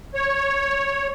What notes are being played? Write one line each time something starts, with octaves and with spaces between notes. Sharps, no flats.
C#5